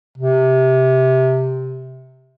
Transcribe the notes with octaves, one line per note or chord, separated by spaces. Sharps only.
C3